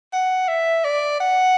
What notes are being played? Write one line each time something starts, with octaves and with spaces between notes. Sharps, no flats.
F#5
E5
D5
F#5